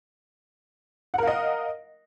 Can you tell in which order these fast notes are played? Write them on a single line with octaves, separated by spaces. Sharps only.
F#5 A#4 F5 D#5